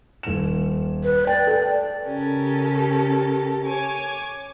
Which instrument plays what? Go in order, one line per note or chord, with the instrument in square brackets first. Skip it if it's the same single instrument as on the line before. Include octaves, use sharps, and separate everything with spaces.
[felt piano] D#1 E7
[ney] B4
[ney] D5 [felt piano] G5
[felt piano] A4 G5
[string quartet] C#3 C#4 G4 A4 A#4
C#5 G#5 D6